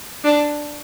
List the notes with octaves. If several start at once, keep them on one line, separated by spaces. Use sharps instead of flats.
D4